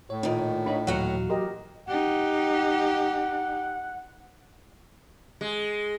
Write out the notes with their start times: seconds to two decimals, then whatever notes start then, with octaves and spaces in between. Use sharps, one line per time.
0.10 A2 C#5
0.23 A#2 D#3 D#4
0.66 D4 D#4 F4 C#5 B5
0.87 D#2 A#2 E3 F#3 F#4 C#5 F5 F#5
1.29 G4 A#4 D#5
1.88 D#4 G4 F#5
5.41 G#3